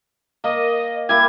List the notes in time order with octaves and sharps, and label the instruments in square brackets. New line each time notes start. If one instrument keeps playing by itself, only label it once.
[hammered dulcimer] A#3 [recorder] D#5
[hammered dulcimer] A#3 E4 G4 [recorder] G#6